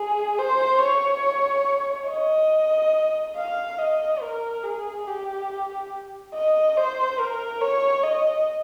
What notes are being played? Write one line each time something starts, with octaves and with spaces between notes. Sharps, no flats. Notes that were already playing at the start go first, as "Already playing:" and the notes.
Already playing: G#4
C5
C#5
D#5
F5
D#5
A#4
G#4
G4
D#5
C5
A#4
C#5
D#5